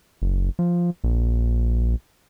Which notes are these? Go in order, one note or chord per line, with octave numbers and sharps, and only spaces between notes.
F#1
F3
A#1